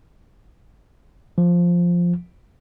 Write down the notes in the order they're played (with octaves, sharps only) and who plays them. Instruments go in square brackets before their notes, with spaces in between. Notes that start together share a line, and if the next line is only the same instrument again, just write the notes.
[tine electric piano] F3